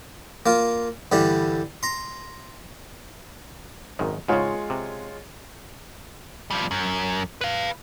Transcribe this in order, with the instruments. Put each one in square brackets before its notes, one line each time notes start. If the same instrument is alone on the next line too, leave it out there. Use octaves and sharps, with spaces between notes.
[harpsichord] A#3 F4
G2 D3 E3 G3
A#5 C6
[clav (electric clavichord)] G#1 F#2 D#3
[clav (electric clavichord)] G#2 C#3 [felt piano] G#3 F4 C#5
[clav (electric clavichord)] C3
[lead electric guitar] F3 G3
F#2
B4 F5